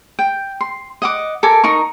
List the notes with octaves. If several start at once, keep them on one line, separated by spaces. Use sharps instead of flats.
G5
C6
D#5 F#5 D6
A4 A#4 G#5 D6
D#4 A#4 C#6